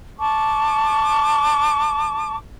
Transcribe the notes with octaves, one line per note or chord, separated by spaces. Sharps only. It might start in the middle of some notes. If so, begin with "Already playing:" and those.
A5 C#6 D6